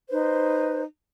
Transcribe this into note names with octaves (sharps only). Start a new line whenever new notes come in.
D#4 B4 C5